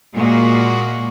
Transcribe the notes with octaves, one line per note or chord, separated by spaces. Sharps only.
A#2 G#3 A#3 F#4